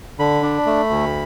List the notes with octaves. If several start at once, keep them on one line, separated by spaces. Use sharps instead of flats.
D3 B5
D4
A3
D2